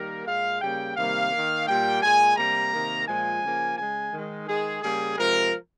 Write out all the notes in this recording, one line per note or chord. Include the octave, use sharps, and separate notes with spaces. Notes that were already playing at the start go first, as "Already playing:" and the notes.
Already playing: D#3 G3 A#3 A#4
A#2 G#3 F5
C#3 G3 A#3 G5
C3 D#3 G3 A#3 F5
D#3 A#3
A#2 G3 A#3 G5
A#2 G#3 G#5
C3 G3 A#3 A#5
C3 D#3 A#3
A#2 F3 G#3 G#5
C#3 F3 A#3
C#3 G#3 G#5
D#3 G#3
D#3 G#3 G#4
C#3 G3 A#3 G#4
C3 F3 G#3 A#4